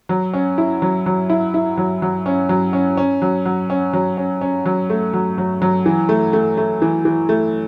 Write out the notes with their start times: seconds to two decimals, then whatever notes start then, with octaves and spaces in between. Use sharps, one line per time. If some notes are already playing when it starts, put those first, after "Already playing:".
0.09 F#3
0.33 C#4
0.58 E4
0.82 F#3
1.06 F#3
1.30 E4
1.54 E4
1.78 F#3
2.02 F#3
2.26 C#4
2.49 F#3
2.73 C#4
2.97 C#4
3.22 F#3
3.46 F#3
3.70 C#4
3.93 F#3
4.17 C#4
4.41 C#4
4.65 F#3
4.90 A3
5.13 F#3
5.38 F#3
5.62 F#3
5.86 E3
6.09 A3
6.33 A3
6.57 A3
6.82 E3
7.05 E3
7.29 A3